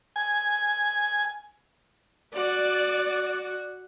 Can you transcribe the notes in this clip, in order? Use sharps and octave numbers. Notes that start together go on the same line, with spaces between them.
G#5
F#4 D5